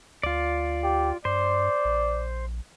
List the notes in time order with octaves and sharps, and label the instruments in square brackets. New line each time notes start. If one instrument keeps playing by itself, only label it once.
[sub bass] D2 [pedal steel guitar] F4 D5
[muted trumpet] G4
[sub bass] G2 [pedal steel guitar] C5 [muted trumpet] D5
[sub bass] A#1